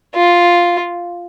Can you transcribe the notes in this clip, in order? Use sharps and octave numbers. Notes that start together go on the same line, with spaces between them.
F4